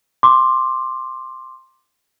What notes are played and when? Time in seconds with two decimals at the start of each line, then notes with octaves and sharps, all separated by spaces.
0.23 C6 D6